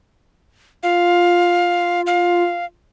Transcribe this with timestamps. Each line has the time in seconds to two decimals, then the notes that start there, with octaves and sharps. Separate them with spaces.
0.83 F4 F5
2.07 F5